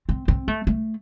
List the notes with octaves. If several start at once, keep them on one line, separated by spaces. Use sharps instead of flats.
C4
C4
A3
A3